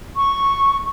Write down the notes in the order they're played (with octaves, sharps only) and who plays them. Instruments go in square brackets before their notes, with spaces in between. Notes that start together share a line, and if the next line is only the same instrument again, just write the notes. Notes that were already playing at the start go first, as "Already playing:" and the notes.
[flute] C#6